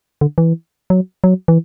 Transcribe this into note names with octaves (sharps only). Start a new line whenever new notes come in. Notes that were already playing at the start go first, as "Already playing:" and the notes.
D3
E3
F#3
F#3
E3